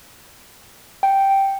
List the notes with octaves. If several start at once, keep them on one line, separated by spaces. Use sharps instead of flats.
G5